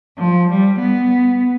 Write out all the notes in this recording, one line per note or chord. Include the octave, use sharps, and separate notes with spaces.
F3
G3
B3